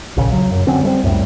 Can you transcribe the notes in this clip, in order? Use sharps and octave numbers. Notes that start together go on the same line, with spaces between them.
A#1 D#2 A#2 C#3
C#3 F#3
F#2
D3 F#3 C4 C#4
G3 A3 C4
C#2 F#2 A2 G3